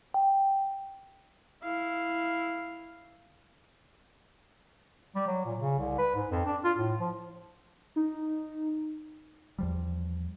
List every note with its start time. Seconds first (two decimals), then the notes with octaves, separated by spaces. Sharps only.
0.14 G5
1.62 E4 F5
5.15 G3
5.27 F#3
5.45 A#2
5.59 C#3
5.79 C2
5.98 B4
6.15 G#2
6.31 F2
6.45 D4
6.64 F4
6.77 A2
7.00 F3
7.96 D#4
9.58 E2 F3 G3